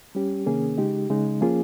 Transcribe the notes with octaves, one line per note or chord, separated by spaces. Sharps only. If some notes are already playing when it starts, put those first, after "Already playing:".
G3 C#4 G4
C3 D#3 A#3 C#4 G#4
C#3 G#3 D#4 G4
C#3 G#3 D#4
F3 A#3 C#4 F4 G#4